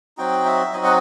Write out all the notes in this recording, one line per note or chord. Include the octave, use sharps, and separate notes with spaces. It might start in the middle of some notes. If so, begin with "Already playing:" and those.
F#3 C4 D#4 F#4 G5
E5
F#3 C4 D#4 F#4 D#5
F#5